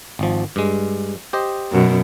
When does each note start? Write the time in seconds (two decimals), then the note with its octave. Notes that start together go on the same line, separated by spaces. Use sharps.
0.19 G#1 F3
0.56 G2 G#3
1.33 G4 C5 D#5
1.72 F#2 B2